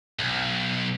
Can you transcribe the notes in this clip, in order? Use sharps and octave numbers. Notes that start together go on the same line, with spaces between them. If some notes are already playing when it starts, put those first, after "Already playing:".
B1